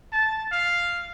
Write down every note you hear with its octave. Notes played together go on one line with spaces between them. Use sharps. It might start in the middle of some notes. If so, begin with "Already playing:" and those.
A5
F5